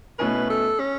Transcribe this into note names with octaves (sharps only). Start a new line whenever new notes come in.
B2 A3 C#4 E4 B4
A4
C#4